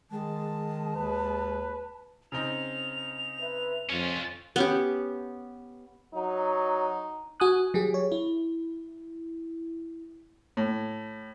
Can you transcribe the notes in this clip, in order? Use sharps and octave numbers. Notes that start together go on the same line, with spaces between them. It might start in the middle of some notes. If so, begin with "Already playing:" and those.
D#3 G#3 A5
D#2 B4
C#3 C4 D#4 F7
B4 E5
F2 C#4 F4
B3 C#4 G4
F#3 D#4
F#4 G#5 D#6 F#6
F#3 G4 G#4
C#5
E4
A2